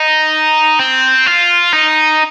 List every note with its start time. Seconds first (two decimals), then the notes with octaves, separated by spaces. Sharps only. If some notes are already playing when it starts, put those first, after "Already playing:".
Already playing: D#4
0.80 C4
1.26 F4
1.73 D#4